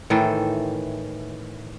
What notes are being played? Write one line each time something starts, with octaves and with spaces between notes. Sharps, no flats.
A2 D#3 E3 A4